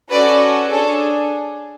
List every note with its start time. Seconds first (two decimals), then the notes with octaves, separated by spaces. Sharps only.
0.10 C#4 F#4 A4 B4 D5
0.70 D4 G#4 A4 C#5